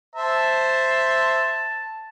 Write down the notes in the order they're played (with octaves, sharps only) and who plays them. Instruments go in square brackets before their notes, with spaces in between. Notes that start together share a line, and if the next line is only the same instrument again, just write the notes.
[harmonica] C5 E5 [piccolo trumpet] A5